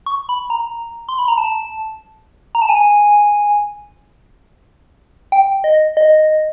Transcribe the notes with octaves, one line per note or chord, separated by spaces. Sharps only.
C#6
B5
A#5
C6
B5
A#5
A5
A#5
A5
G#5
G5
D#5
D#5